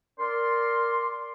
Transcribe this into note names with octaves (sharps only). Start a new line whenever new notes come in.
A#4 D5 C6